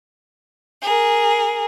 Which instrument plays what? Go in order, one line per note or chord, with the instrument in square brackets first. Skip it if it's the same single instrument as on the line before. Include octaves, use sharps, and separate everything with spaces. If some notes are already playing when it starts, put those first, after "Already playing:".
[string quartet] G#4 A#4